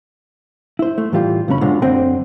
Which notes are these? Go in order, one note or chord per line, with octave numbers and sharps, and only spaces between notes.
E4 C5
A3
A2 E3 G3 F4 G4
C#2 F#2 C#3 C#4 B5
B2 D3 F#3 G#3 F4
F#2 D3 C4 D#5 G5